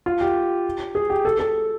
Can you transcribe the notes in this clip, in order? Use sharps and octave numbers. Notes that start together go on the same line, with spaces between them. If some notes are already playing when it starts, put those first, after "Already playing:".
F4
G4
G#4
G4
A4
A4